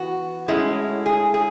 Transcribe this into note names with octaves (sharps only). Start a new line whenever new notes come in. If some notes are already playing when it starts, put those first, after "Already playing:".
Already playing: E3 B3 F#4
A2 G#3 C#4 E4
G#4
G#4